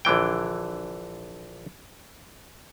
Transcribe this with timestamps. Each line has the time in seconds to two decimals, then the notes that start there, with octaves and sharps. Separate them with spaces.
0.05 A#1 D3 E3 G5